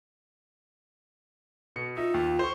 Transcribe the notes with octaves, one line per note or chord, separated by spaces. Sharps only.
B2 C#7
D#4 F4 E5
D#2
C5 C#6